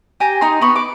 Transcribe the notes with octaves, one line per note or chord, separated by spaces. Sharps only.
G4 G#5 A#5
D#4 A#5 C6
B3 B5 C#6
D6